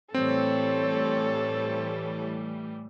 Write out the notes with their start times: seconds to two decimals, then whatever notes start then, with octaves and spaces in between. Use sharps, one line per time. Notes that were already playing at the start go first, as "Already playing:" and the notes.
0.14 A2 E3 G3 C4 A4 C#5